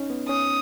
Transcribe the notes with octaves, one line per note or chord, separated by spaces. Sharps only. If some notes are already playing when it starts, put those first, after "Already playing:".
Already playing: C#4 D#4
B3
C#4 D#6